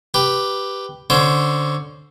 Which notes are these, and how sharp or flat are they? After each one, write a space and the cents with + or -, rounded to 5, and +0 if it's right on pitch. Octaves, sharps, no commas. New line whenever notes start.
G4 +0 B4 +0
D3 +0 C#4 +10 C5 +0